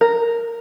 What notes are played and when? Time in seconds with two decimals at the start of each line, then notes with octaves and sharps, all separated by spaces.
0.01 A#4